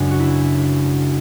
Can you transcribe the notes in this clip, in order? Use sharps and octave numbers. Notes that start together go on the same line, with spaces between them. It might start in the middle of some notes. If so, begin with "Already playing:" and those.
Already playing: F#2 C#3 G#3 D4
F#4
E4